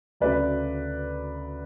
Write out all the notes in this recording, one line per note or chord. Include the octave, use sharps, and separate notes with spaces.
D2 C#3 F#3 A3 B4 D5